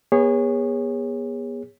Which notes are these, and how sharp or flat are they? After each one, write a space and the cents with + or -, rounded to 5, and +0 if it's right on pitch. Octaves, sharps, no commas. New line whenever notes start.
B3 -35 G#4 -25 C#5 -5